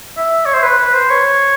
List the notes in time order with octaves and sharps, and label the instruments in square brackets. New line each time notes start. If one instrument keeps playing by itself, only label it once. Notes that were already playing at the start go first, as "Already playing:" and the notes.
[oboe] E5
C#5
C5
B4
B4
C5
C#5